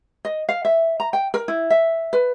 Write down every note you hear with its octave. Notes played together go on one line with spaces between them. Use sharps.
D#5
F5
E5
A#5
G5
A#4
E4
E5
B4